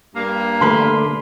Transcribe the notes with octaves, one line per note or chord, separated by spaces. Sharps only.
G2 G3 A#3
D3 A3 B4 B5 C6